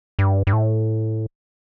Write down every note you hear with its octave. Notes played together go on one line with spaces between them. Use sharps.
G2
G2
A2